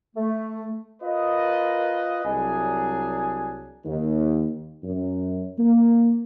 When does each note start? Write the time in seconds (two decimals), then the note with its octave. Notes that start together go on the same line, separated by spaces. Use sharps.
0.15 A3
1.02 F4 A#4 B4 D#5
2.25 C2 F#3 D4 G#4 G#5
3.85 D#2
4.83 F#2
5.57 A#3